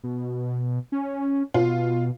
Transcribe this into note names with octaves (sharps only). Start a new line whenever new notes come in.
B2
C#4
B2 F4